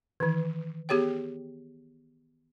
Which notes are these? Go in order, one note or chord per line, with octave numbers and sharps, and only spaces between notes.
D#3 E3
B3 G4 G#4 C#5 G5